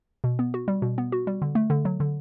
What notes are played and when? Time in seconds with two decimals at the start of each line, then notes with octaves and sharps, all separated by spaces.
0.24 B2
0.39 B3
0.54 F#4
0.68 G3
0.82 B2
0.98 B3
1.12 F#4
1.27 G3
1.42 D3
1.55 A3
1.70 D3
1.85 F#3
2.00 D3